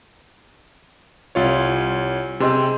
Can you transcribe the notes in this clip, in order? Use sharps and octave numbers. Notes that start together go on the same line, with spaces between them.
C2 F4 C#5
C3 C4 G#4 C5 D#5